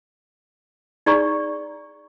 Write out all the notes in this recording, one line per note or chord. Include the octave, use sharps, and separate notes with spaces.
D#4 G#4 D5 A#5 C#6